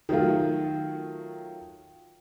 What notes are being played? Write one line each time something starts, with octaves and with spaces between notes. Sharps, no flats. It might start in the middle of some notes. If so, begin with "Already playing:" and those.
D#3 F#3 A3 F4